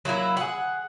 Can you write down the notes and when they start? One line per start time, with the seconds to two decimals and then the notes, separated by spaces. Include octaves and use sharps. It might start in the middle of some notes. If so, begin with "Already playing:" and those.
0.05 F#3 A#3 D#4 E4
0.37 G#4 F#5